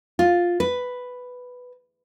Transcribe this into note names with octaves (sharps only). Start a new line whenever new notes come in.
F4
B4